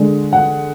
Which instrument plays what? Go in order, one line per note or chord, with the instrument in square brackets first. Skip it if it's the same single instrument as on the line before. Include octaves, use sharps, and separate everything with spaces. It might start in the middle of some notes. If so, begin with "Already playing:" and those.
Already playing: [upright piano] D3 G#3 D4
F#5